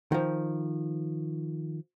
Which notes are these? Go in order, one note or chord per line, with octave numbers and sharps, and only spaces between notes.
D#3 F3